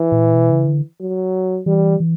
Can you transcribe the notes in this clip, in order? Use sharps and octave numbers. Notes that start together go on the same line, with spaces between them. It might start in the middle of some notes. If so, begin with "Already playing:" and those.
Already playing: E3
A#2
B2
C#3
D3
F#3
E3 G3
E3